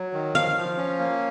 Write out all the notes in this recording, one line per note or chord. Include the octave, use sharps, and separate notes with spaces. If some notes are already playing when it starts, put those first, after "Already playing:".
Already playing: F#3
D#3
F3 F5
F3
C#4
A#3